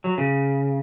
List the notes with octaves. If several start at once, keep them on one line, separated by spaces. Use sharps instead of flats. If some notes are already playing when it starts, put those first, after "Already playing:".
F#3
C#3